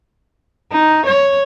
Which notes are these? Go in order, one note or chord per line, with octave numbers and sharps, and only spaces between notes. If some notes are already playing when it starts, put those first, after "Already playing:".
D#4
C#5